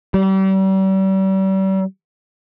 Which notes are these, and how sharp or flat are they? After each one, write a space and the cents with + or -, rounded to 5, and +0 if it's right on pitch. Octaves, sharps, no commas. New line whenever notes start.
G3 -35